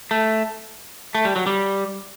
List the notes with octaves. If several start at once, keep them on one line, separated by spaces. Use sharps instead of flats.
A3
A3
G3
F#3
G3